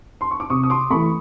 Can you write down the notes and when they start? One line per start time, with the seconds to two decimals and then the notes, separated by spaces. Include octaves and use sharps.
0.21 C6
0.31 C#6
0.40 D6
0.50 C3 C#6 D#6
0.63 D#6
0.70 C6 D6
0.90 E3 A3 B5 C#6